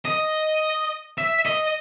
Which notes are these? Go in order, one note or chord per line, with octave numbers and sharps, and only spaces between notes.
D#5
E5
D#5